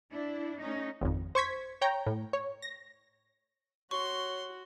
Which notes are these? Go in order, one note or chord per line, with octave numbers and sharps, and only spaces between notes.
D4 E4
A3 C#4 D#4
G#1 F2
C5 C#6 G#6 B6
C#5 G5 A#5
A2
C#5
A#6
F#4 C#5 C6 C#6